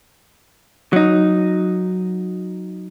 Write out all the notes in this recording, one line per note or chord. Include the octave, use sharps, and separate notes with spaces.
F#3 D#4